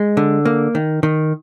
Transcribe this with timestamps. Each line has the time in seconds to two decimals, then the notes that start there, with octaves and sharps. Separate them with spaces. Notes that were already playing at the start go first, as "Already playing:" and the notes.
Already playing: G#3
0.17 D3
0.45 A#3
0.75 D#3
1.03 D#3